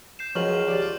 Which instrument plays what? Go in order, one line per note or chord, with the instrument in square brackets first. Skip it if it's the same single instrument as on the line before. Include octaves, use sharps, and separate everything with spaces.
[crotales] G6 C7 E7
[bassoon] C#2 [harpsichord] F#2 [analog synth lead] F3 [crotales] C#6 F6 F#7
[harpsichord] D#2 [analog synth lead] D5
[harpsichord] F4